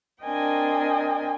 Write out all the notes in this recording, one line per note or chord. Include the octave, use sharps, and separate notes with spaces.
C4 D4 A#4 D#5 G5 G#5